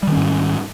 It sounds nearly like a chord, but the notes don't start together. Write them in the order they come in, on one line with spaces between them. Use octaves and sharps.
G3 D#3 C#4 G#2